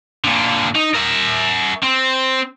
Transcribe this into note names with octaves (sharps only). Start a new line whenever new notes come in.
A#2 D3
D#4
A#4 E5
C4